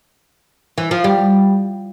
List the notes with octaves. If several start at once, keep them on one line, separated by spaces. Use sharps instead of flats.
E3
F3
G3